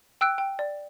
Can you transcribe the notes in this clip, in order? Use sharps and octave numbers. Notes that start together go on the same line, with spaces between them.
G5 E6 F#6 D7
G5
D5